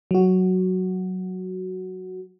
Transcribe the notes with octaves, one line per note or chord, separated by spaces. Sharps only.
F#3 F#4